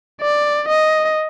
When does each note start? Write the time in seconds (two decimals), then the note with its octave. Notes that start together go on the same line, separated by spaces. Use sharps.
0.22 D5
0.68 D#5